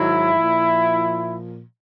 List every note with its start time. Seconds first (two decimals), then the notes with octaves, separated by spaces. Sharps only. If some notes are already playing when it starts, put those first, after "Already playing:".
Already playing: G#2 D#3 F#3 E4
0.34 A#2 F3